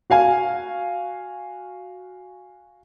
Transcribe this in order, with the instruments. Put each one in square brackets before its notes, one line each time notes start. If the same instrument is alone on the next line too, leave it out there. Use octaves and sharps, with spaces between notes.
[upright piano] F#4 F5 G#5